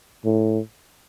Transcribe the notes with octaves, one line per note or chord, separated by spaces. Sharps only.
A2